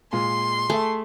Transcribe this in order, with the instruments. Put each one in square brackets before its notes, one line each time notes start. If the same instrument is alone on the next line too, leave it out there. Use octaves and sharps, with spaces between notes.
[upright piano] A#2 G#3 F4 [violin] C6
[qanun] A3 [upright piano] G#4 E5